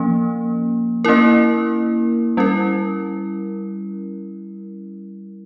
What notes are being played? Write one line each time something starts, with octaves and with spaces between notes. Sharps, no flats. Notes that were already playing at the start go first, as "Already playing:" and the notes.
Already playing: F3 A#3 C#4
A#3 C#4 E4 A#4
G3 C#4 E4 A#4